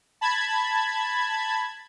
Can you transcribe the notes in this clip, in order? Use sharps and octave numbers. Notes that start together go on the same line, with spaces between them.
A5 B5 G#6